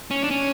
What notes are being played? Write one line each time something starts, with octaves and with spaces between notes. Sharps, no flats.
C#4
D4
C#4